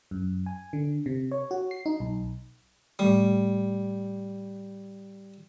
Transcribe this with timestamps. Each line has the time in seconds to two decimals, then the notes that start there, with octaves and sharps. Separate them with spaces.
0.11 F#2
0.46 G#5
0.73 D3
1.06 C3
1.31 C#5
1.51 F#4
1.71 C7
1.86 D#4
2.00 B1
2.99 A2 G3 A3